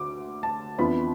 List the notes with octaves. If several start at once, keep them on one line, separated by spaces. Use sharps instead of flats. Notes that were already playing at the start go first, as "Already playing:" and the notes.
Already playing: D2 D6
A5
F2 E3 B3 D4 F4 B5